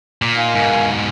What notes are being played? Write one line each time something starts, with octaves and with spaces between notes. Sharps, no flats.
A#2
D#3 F5 G#5
G#2 B2